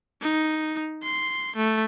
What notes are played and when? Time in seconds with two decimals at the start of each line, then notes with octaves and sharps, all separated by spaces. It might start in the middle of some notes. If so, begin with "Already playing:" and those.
0.22 D#4
1.03 C6
1.56 A3